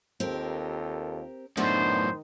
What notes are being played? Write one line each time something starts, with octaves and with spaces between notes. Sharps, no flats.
D#2 C4 F4 G4 A4 A#4
F#2 A2 D#3 A3 B3 D4 D#4 C5